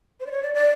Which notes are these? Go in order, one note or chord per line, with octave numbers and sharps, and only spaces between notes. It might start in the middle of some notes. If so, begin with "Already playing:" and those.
C5
D5
C#5
D5
D5